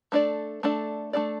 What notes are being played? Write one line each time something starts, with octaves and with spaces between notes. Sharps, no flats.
A3 D4 A4 D5
A3 D4 A4 D5
A3 D4 A4 D5